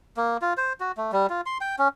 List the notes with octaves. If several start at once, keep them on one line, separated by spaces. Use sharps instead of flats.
A#3
F4
C5
F#4
A3
G3
F4
C6
G5
C#4